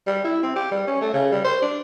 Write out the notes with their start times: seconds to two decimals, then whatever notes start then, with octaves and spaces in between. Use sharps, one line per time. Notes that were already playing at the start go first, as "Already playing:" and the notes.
0.07 G3
0.24 E4
0.43 C4
0.56 G4
0.72 G3
0.87 C#4
1.01 A3
1.14 C#3
1.32 G3
1.45 C5
1.62 D4